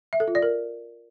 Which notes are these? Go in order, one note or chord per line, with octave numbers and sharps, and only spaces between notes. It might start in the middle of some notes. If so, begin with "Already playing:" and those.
E5
A4
F4
D5
A#4